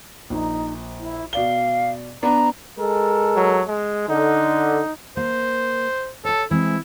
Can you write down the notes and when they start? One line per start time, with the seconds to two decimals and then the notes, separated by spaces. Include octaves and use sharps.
0.30 A#1 D#4
1.00 E4
1.33 B2 D5 F5 G7
2.23 B3 D4 A#5
2.78 G#3 A4 A#4
3.36 F#3
3.68 G#3
4.09 D3 D#4
5.17 A#3 C5
6.25 A4 C#5 A5
6.51 E3 G#3 C4 E4